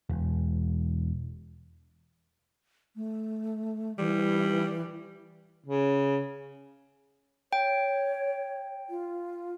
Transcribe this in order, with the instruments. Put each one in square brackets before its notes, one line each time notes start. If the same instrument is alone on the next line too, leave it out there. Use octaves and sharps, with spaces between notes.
[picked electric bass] E1
[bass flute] A3
[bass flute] E3 [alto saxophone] G3
[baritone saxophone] C#3
[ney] C#5 [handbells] G5
[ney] F4